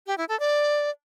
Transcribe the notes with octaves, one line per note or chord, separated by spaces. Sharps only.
G4
E4
A4
D5